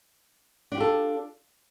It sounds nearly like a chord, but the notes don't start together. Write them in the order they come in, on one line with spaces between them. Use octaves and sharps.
D4 G4 F4 A4